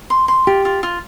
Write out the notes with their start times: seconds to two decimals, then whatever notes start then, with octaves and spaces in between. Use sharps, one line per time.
0.10 C6
0.28 C6
0.47 F4 G4
0.65 F4
0.83 F4